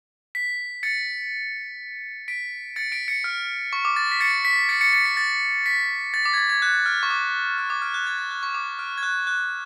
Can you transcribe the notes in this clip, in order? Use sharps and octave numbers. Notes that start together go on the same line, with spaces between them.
B6
A6 C#7
B6 D7
A6 C#7
B6 D7
A6 C#7
F6
C#6
D6
A6
B6
A6 C#7
B6
A6 C#7
A6 C#7
A6 C#7
B6
A6
B6
A6
D6
G#6
A6
G#6
F#6
F6
C#6
D6
F6
D6
F6
F#6
G#6
A6
F#6
C#6
D6
F6
G#6
F#6
F#6